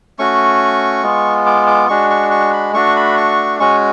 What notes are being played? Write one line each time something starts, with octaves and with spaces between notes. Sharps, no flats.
A3 C#4 F#4 C#6
G#3 B3 F4
D6
D6
G#3 D4 F#4 C#6
C#6
C#6
B5
A3 D4 F#4 C#6
B5
C#6
G#3 C#4 F#4 C#6